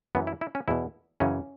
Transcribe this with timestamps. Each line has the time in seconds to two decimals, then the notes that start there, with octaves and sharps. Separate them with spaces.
0.15 F#2 E3 B3
0.27 E4
0.41 E4
0.55 C#4
0.68 E2 B2 E4
1.20 F#2 C#3 E3 C#4